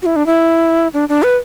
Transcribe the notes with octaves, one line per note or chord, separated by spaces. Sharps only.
F#4
E4
D4
E4
D4
D4
B4